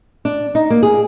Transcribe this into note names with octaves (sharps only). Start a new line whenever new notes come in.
D4
D#4
A#3
G#4